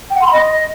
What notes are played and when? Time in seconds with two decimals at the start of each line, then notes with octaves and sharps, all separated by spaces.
0.10 G5
0.16 F#5
0.21 C6
0.27 B5
0.32 D#5